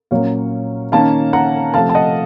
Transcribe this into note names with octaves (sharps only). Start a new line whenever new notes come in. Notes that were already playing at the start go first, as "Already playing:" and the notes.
A#2 F#3 A#3 C#4 C#5 F5
D#3 A#3 C#4 F5 A5
F#5 A#5
C3 F3 A3 F5 A5
A5
D#5 F#5